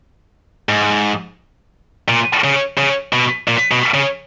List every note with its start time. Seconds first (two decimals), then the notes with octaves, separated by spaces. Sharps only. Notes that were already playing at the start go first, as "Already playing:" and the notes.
0.69 G#2
2.08 A#2
2.44 C#3
2.78 C#3
3.13 B2
3.48 A#2
3.71 B2
3.94 C#3